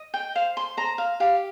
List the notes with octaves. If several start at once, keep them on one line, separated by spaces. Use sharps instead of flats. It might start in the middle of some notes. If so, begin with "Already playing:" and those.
Already playing: D#5
G5
C5 F5
C6
C5 A#5
F5
G4 F5